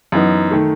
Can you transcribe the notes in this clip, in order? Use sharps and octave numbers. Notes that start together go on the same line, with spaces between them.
F#2 E3 B3 D#4
D#3 A3